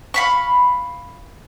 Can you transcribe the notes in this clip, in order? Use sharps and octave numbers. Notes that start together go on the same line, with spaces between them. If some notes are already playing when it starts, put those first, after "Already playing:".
F5 B5 C#6